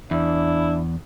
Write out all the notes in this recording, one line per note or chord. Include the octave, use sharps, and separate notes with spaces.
E2 D4 E4